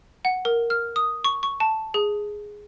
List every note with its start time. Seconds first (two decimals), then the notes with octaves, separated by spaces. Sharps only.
0.25 F#5
0.45 A#4
0.70 F6
0.96 D#6
1.24 C#6
1.43 C#6
1.60 A5
1.94 G#4